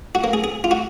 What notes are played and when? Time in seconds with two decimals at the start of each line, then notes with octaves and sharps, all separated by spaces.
0.15 F#4
0.24 A#3
0.33 G#4
0.44 G#4
0.64 F4
0.71 F#4